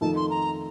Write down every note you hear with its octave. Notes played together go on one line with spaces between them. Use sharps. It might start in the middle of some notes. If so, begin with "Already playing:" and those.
F2 D#3 A3 D#4 A4 A5
C6
A#5